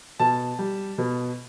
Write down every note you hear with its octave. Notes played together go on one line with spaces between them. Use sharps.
B2 A5
G3
B2